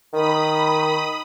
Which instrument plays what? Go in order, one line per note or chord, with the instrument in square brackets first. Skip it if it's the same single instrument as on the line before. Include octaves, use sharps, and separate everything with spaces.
[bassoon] D#3 [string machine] B5 D#6